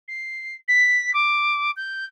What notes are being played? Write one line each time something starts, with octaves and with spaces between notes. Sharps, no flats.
C7
B6
D6
G6